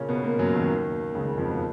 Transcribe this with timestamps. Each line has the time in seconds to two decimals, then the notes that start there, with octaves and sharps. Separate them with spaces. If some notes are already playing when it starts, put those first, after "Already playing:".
Already playing: A#2 C#3 A#3 C#4
0.09 B2 B3
0.23 A#2 A#3
0.39 F#2 F#3
0.54 D#2 D#3
1.15 C#2 C#3
1.26 C#2 C#3
1.38 F2 F3
1.49 B2 B3